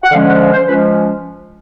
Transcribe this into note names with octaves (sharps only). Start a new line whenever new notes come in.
F#5
D3 F3 G#3 C#4 F5
F#5
F5
C5
F3 G#3 C#4 B4